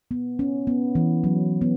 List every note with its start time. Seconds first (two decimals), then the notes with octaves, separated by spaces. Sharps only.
0.11 B3
0.39 C#4
0.67 B3
0.95 E3
1.24 F#3
1.61 B3